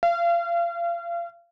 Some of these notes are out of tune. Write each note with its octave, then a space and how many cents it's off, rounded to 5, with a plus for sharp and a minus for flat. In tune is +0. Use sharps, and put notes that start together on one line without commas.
F5 -35